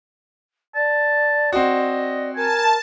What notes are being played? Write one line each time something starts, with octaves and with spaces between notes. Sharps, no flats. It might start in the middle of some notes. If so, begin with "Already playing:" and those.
D5 A5
C4 F#4 D#5
A#4 G#5 A5